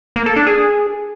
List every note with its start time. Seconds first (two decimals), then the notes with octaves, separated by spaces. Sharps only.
0.16 A#3
0.26 A4
0.36 D4
0.47 G#4